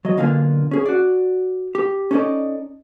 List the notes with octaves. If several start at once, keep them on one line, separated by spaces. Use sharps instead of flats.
F#3 D#5
B1 D3 A#3 D4 F4 G#5
C#4 G#4
F#4 D5
G4
C#4 D#4 A4 B4 D5 D#5